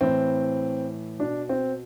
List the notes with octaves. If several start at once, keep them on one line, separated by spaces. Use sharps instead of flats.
A2 E3 C4
B2 D4
C4